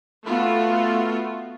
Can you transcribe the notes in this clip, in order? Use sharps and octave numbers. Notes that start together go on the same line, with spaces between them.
A3 B3 F4 F#4